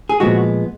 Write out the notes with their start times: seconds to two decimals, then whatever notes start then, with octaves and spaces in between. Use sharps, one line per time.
0.09 G#4
0.20 A#2 F3 G#3 B3 F#4